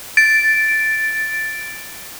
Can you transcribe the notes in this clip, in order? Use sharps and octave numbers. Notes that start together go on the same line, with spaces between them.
A6 D7